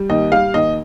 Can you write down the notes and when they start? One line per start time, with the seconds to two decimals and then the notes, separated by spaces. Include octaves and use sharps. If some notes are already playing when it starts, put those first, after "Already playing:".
Already playing: G3
0.09 D#2 D#5
0.32 G3 F5
0.54 D#2 D#5